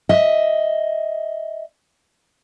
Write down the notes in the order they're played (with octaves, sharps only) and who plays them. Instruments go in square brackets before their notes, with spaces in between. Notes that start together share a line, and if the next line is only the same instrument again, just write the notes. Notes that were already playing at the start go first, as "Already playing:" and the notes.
[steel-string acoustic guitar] D#5 E5